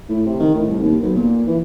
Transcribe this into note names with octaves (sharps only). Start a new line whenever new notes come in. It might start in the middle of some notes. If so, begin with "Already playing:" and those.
A2
C3
D#3
A2
C2
D#2
B1
A#2
E3